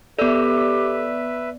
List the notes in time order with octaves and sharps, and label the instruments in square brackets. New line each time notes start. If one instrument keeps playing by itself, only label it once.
[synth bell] B3 D5 [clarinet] G4 [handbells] A4 E6 [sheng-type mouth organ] B4 E5